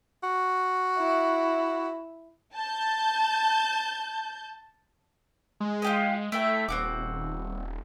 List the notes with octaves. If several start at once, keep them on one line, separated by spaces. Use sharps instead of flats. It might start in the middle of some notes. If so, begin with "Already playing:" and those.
F#4
E4
A5 G6
G#3
F4 G4 D#5
A3 E4 E5 G5
D#1 C4 F#4 D6